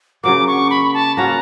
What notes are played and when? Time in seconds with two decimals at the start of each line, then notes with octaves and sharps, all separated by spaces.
0.24 C#3 F#3 A#3 D6
0.47 C#6
0.70 B5
0.94 A5
1.17 A#3 C#4 F#4 A#5